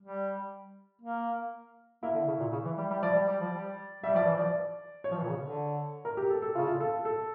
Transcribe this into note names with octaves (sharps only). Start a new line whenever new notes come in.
G3
A#3
A#3 E4
D3
C#3
A#2
C#3
E3
G3
G3
F3 D5
G3
G3
F3
G3
G3 E5
F3 D5
E3 D5
F3
D5
C#5
F3
E3
A#2
C#3
D3
A#4
G4
A4
A4
C#3 F4
F4
A4
A4